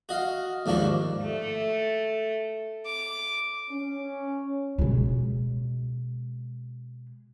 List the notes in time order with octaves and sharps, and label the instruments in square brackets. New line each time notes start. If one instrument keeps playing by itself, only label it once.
[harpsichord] F#4 D#5 F5
D#2 G#2 F3 D4 C#6
[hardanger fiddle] A3
D6
[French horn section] C#4
[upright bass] B2 G#3